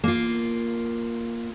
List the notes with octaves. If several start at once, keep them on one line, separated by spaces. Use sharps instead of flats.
A#3 F4